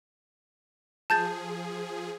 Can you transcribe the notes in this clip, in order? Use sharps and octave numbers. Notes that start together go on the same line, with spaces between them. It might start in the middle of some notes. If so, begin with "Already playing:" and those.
F3 G#4 A5 G6 A6